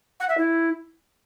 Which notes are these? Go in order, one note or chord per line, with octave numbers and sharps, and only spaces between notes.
F#5
E5
E4